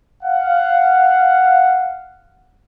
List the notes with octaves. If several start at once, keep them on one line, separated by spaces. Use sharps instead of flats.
F5 F#5